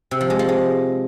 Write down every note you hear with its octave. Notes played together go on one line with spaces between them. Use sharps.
C3
F3
G#3
F3
G#3